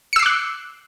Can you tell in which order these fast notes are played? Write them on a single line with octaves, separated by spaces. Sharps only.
C#7 E6 C7 D6 F#6